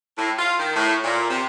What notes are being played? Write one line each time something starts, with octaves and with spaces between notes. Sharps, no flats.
A2
F4
D#3
A2
A#2
C3